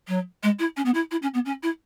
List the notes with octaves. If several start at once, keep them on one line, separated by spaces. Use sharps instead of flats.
F#3
G#3
E4
C#4
B3
E4
E4
C#4
B3
C#4
E4